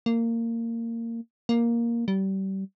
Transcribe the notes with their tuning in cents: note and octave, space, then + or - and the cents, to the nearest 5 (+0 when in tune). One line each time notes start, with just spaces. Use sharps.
A#3 -20
A#3 +5
G3 -30